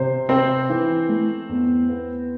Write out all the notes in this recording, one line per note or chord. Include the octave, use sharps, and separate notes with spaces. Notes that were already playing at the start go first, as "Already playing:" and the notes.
Already playing: C3 C5
C4 C5
E3
A3
E2
B3